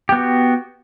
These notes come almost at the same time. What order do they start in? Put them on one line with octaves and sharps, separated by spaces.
G4 B3 F#4